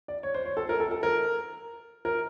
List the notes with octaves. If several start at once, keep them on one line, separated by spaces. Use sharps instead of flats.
D5
C#5
C5
C#5
A4
A#4
A4
A4
A#4
A#4